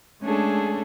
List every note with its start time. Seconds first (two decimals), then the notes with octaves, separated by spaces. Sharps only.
0.22 G#3 A3 C#4 D4 G#4 A4